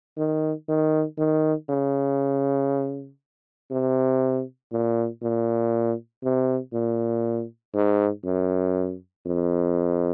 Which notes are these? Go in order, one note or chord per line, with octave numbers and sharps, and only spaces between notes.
D#3
D#3
D#3
C#3
C3
A#2
A#2
C3
A#2
G#2
F#2
F2